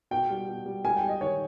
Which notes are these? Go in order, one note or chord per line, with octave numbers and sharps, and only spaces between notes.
B2 G5
G3
B2
G3
G3 G#5
G5
G3
D#5
D#3 C#5